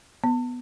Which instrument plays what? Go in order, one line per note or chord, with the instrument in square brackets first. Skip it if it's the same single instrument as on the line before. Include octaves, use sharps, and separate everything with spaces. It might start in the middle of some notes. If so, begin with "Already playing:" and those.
[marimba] B3